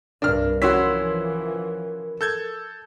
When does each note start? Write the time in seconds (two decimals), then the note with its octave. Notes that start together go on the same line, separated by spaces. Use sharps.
0.22 C2 G2 D4 A#4 F6
0.62 E3 F3 C#4 E4 F#4 C6 E6 B6
2.21 A4 G6 G#6